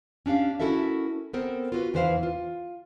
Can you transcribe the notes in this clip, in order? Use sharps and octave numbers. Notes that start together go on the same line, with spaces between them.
C#4 D4 G4 F5
C#4 E4 F#4 A4 A#4 E5
B3 C4 A4 A#4 C5
F4 F#4 B4
E2 E3 B4 C5 E5 F5
F4